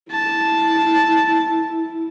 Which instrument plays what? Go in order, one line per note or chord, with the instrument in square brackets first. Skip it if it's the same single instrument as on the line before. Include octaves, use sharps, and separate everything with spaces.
[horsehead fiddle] E4 [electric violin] A5